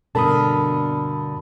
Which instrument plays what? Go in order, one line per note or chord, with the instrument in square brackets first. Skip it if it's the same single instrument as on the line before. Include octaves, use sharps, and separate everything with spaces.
[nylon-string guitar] G2 D3 [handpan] B2 A#4 [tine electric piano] A5 B5 D#6